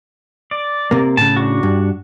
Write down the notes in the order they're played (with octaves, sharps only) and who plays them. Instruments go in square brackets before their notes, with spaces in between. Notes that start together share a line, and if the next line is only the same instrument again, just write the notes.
[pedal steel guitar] D5
[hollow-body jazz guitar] C3 A#3
[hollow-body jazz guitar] A2 C#3 [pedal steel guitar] A5
[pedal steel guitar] D4 F#4
[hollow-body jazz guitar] G2